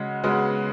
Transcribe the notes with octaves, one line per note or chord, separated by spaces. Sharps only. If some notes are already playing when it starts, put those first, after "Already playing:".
Already playing: C#3 G#3 F#4
C#3 G#3 B3 F#4